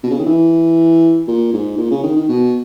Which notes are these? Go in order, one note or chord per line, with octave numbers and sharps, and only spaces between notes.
B2
C#3
D#3
E3
A#2
G#2
A#2
C#3
D#3
D#3
B2